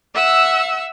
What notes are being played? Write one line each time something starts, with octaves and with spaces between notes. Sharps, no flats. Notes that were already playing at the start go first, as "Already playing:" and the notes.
E5 F#5 E6